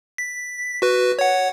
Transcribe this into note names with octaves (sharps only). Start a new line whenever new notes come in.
B6
F#4 B4
C#5 F#5